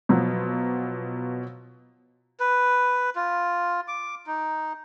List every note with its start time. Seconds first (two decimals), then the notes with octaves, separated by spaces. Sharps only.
0.09 B2 F3 F#3
2.40 B4
3.16 F4
3.88 D6
4.27 D#4